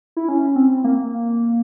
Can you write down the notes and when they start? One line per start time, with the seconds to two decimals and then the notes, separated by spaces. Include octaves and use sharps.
0.17 E4
0.29 C#4
0.56 C4
0.84 A#3